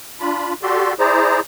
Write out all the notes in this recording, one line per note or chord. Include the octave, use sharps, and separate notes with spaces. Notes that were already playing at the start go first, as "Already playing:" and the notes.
D4 F4 B5
F#4 G4 A4 D5 C6
E4 G#4 C5 D5 A#5